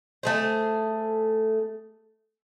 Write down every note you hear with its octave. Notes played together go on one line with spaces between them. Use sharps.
A3 G#4 C5